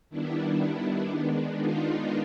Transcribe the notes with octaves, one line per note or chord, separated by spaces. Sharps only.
D#3 G3 B3 D4 E4
D4
D#3 G#3 B3 D4
D#4 F4